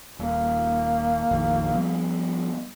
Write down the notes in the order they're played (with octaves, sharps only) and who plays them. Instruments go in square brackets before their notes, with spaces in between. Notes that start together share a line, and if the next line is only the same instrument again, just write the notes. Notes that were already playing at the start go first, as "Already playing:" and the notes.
[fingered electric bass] D#1 [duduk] A#3
[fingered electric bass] A#1 F2 D#3
F3 G3 B3